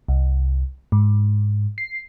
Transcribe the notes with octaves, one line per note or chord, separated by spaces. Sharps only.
C2
G#2
C7